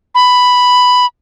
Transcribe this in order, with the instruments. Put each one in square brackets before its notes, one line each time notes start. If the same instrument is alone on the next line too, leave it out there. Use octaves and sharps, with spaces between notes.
[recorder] B5